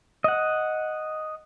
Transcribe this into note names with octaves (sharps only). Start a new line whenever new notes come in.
D#5 F#5